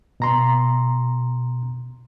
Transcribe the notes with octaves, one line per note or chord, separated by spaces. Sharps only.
B2 A#5 C6